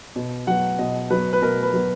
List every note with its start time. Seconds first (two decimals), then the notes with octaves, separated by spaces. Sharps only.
0.16 B2
0.47 F#3 B3 F#5
0.79 B2 D#5
1.10 F#3 B3 B4
1.33 B4
1.42 B2 A#4
1.63 B4
1.73 F#3 B3